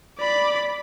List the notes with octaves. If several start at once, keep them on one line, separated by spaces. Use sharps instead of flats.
D5 B5